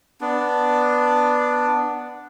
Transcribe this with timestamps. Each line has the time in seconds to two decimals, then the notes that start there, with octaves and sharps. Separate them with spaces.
0.21 B3 D4